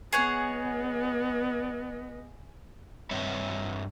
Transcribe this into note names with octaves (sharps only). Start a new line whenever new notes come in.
B3 G#4 C#5 D#5 F#5
G2 C4 B4 C#5 E5